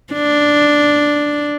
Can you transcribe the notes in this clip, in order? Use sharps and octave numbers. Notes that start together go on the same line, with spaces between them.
D4